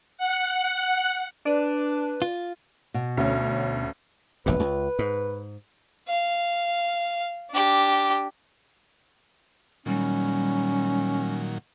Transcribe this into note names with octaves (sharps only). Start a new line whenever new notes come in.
F#5
D4 B4 D5 D#7
F4
B2
D2 C#4
E1 A#1 G2 B4
C#2
G#2
F5
D4 G4
A#2 D#3 F#3 G3 C#4